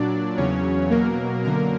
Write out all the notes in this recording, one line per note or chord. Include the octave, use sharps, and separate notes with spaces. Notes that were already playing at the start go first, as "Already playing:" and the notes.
Already playing: A#2 F#3 D4 D5
E2 C#3 F#3 C#4 C#5
B2 F#3 A#3 A#4
F#2 D3 A#3 A#4